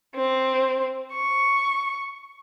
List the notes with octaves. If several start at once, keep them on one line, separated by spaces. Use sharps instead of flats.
C4
C#6